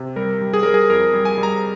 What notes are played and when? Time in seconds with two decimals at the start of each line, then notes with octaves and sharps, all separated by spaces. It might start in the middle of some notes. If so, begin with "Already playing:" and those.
Already playing: C3
0.16 G3 A#4
0.41 G3
0.54 G#4
0.63 G3 A#4
0.74 G#4
0.90 F2 A#4
1.14 G3
1.25 G#5
1.38 G3
1.43 A#5